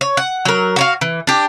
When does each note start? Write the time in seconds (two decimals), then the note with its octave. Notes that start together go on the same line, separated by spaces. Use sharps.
0.01 C#5
0.17 F#5
0.45 F#3 A#4
0.76 F#4 C#5 F5
1.01 E3
1.27 D4 G4